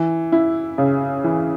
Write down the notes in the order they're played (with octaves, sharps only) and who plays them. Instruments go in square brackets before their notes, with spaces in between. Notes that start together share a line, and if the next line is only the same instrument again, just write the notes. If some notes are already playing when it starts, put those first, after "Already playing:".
Already playing: [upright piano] E3
E4
C#3
E3